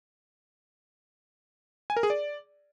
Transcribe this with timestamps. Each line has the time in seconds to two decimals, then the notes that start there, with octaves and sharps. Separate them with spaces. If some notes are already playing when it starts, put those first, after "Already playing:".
1.90 G#5
1.97 A#4
2.03 G#4
2.10 D5